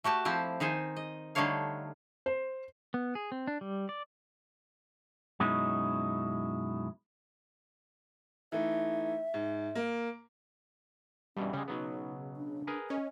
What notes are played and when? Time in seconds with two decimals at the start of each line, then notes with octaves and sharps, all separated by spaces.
0.04 A3 F#4 G4 A5
0.25 F3 C4 E4 G4
0.60 D#3 D#4 C5 G#5
0.96 D#5
1.35 D3 G3 A3 D#4 C#5 F5
2.26 C5
2.94 B3
3.15 G#4
3.32 C4
3.47 D4
3.61 G3
3.89 D5
5.40 F#2 B2 G#3 C#4 D#4 E4
8.52 E3 A3 D#4 E5
9.34 G#2
9.75 A#3
11.37 G2 B2 E3 G3 C#4
11.53 C#3 G3 G#3
11.68 B2 F#3 B3 D#4
12.36 D4
12.67 G#4 A#4 B4
12.90 C#4 D#5